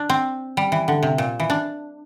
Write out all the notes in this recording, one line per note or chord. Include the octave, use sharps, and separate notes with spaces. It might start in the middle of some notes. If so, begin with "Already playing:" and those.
Already playing: D4
C4
G3
E3
D3
C3
A#2
E3
D4